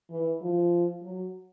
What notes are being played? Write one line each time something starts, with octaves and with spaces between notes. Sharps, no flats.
E3
F3
F#3